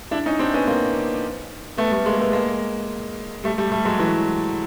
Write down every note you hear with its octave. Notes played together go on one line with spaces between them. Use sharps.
D4 E4
C#4 D#4
C4 D4
B3 C#4
A#3 C4
A3 B3
G3 A3
G#3 A#3
A3 B3
G#3 A#3
G3 A3
G3 A3
G3 A3
F#3 G#3
E3 F#3